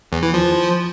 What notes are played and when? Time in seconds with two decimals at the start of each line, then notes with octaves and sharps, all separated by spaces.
0.12 E2
0.23 E3
0.34 F3